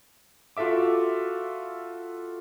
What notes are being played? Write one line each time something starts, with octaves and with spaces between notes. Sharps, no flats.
F4 F#4 A4 E5 D6